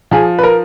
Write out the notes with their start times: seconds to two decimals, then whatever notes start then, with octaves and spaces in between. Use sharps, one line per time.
0.11 F3 G#4
0.39 B4
0.43 A#4